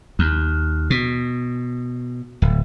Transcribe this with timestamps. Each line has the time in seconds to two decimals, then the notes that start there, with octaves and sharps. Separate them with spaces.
0.19 D#2
0.90 B2
2.42 D1